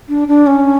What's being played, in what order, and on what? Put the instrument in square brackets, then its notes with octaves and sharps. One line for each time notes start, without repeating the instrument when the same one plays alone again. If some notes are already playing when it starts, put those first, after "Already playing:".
[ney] D4
D4
C#4